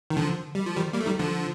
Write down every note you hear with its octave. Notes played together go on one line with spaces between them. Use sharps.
D#3
D3 F3
G3
F3
D#3 G3
G3 A#3
A3
D#3 G3
D3 F3